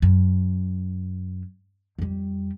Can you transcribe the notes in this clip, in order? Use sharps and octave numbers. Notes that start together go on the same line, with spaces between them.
F#2
F2 G3